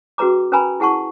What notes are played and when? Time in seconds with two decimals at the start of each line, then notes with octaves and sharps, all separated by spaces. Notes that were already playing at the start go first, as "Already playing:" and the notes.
0.18 C#4 F#4 G#4 B4 A#5 D6
0.52 C#4 A#4 B4 G#5 A#5 B5
0.80 E4 G#4 F#5 A5 C#6